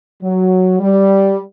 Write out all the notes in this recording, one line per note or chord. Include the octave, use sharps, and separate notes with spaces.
F#3
G3